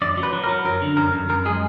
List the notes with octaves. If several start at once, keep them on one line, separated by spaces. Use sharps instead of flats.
F#2 D5
F#3
B4
F#3
A#4
F#3
F#2 A#4
D3
F#2 A#4
F#2
F#2 A#4
G#3 G#4